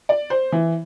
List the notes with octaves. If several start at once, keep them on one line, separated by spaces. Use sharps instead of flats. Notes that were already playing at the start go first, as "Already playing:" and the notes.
D5
C5
E3